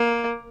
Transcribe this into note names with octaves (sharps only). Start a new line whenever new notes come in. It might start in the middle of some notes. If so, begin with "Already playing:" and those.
Already playing: A#3